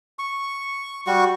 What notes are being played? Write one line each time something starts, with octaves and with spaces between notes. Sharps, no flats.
C#6
G3 F#4 C#6